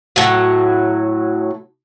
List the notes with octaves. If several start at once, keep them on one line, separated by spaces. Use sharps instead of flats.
A2 F#3